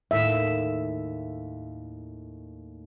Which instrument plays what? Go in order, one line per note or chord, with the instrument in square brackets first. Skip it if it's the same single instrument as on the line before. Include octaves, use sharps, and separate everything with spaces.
[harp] D#2 A2 [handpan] E5